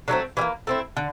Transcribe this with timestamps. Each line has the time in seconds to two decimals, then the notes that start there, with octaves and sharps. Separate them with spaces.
0.08 D3 F#3 A3 C4
0.37 E3 G3
0.41 A#3
0.67 A3 C4 E4
0.97 D3